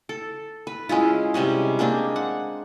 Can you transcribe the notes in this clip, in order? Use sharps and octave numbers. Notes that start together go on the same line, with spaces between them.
A4
B4
G#3 C#4 E4 F4
C3 G3 G#3 C#4
G#3 A#3 C4 D4
F#5